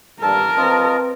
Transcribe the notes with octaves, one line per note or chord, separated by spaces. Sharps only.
G2 A4 A#4 A5
C4 F4 B4 D#5 A#5